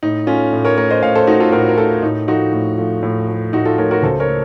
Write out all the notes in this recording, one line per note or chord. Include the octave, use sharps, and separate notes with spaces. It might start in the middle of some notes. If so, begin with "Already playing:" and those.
A2 D#4
A3 C#4 F4
A2
A#4 C#5
A3 A#4 C#5
C5 D#5
A2 C#5 F5
A4 C5
A3 D#4 F#4
F4 A4
A2 F#4 A#4
A#4
A3 F4 A4
A2 D#4
F3 A3 D#4 F#4
A2
F3 A3
A2
F3 A3
A2 D#4 F#4
F4 A4
F3 A3 A#4 C#5
F#4 A#4
C#2 A4 C5
A#4 C#5
A3